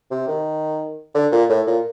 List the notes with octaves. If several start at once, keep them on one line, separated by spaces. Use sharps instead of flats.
C3
D#3
D3
A#2
A2
A#2